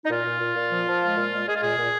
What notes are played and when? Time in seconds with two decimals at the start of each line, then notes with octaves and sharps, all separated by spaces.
0.05 D#4
0.10 A#2 F4
0.25 A#2
0.40 A#2
0.56 A#2
0.71 F3
0.87 F3
1.01 G#3
1.17 A#2
1.32 G#3
1.47 G#3 G#4
1.55 F4
1.62 A#2 G#4
1.78 A#2